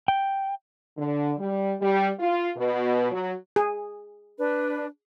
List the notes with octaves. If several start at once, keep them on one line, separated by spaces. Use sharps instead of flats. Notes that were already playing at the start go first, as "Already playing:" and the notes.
G5
D3
G3
G3
F4
B2
F#3
G#4
D4 B4